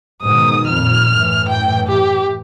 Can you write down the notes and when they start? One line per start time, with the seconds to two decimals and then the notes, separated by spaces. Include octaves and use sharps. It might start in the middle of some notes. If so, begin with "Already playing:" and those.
0.22 G#2 B2 D#3 D#6
0.67 F2 A#2 F6
1.14 F#2 A2 E3
1.49 G5
1.88 G4